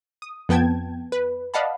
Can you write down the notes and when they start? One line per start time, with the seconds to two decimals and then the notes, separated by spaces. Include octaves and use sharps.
0.22 D#6
0.49 F2 B3 G5 A5 G#6
1.12 B4
1.54 D5 D#5 F5 F#5 A5 B5